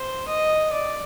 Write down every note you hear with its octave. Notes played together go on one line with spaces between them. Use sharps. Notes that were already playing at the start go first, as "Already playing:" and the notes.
Already playing: C5
D#5
D5